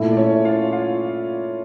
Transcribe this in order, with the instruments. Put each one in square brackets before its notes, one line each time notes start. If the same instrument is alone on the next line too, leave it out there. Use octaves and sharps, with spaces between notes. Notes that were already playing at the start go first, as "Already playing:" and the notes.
Already playing: [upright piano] A#2 A3 E4
[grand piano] D5
C#4 C#5
F4 F5
F4 F5